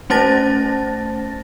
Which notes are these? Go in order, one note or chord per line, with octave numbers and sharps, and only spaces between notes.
A3 C#4 C5 A5 A6 A#6